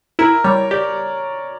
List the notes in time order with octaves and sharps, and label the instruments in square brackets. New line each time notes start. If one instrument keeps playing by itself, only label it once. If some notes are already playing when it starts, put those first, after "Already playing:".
[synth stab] E4 [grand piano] A#4
[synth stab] G3 [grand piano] C#5
[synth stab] G4 [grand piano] D5